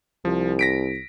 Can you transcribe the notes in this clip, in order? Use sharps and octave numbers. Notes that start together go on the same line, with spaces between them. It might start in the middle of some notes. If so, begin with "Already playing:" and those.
C2 F3
A#6 B6 D7